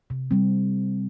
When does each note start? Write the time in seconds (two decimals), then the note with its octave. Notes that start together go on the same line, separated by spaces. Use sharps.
0.10 C3
0.31 G3 C4